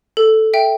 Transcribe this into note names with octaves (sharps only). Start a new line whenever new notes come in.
A4
E5 G5